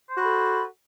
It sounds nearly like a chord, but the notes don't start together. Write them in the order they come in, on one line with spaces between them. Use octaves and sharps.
C5 F#4 B5 A4